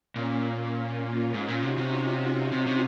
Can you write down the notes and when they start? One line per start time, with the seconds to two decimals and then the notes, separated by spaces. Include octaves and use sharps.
0.15 A#2 A#3 C#4
1.04 C#4 F4
1.33 G#2 C#4 F4
1.48 A#2
1.63 C3 D#4 F#4
1.77 C3
1.93 C#4 F4
2.52 C3
2.67 C3